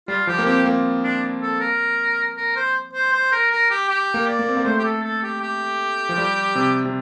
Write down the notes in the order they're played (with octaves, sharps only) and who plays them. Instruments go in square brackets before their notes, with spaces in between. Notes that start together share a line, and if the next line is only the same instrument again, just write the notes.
[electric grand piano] G3 [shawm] F4
[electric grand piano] F3 [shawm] G4
[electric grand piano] A#3
[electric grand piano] C4 [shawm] G4
[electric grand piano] A#3
[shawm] D4
A4
A#4
A#4
C5
C5
C5
A#4
A#4
G4
G4
[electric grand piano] A#3
[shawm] D5
[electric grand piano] A#3
C4
A#3
[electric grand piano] A3 [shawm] C5
[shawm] G4
A4
A4
G4
G4
[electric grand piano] F3
G3
C3
C3